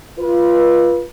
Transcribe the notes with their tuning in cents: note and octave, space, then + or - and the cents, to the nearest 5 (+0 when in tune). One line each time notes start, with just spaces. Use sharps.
F4 -10 B4 -25